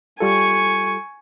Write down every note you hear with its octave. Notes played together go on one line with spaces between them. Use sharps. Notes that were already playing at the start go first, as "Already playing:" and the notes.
G3 F4 A4 G#5 C#6